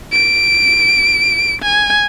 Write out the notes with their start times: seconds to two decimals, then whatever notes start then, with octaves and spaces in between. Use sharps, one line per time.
0.12 D7
1.62 G#5